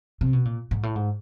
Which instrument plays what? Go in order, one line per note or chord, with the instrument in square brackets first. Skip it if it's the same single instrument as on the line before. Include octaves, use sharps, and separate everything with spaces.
[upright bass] C3
B2
A#2
G#2
A2
G#2